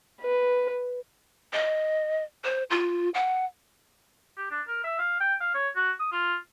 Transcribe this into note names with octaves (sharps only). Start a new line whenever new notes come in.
B4
D#5
C5
F4
F#5
G4
D4
A#4
E5
F5
G5
F5
C#5
F#4
D#6
F4